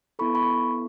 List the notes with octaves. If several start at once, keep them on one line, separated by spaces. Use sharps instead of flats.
B3 E4 A4 B5 C#6
B5 C#6